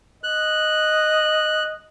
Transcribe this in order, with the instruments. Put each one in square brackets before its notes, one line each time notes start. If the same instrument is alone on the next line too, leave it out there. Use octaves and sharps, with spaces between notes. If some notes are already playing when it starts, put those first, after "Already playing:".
[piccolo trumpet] D#5 [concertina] F#6